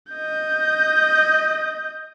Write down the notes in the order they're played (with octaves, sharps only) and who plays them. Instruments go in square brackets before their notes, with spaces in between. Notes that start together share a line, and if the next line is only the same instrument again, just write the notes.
[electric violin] D#5 G6